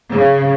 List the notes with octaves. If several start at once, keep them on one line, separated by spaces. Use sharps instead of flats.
C#3